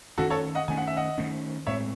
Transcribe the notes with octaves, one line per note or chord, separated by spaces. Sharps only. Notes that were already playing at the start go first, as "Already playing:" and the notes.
D#3 A3 C#4 F#4 A4
A4 C#5
D#5 F#5
D#3 A3 C#4 G#5
F#5
E5
D#5 F#5
D#3 A3 C#4
A2 G#3 C4 C#5 E5